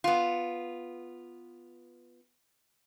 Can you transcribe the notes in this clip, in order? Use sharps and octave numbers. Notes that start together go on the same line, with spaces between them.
B3 F4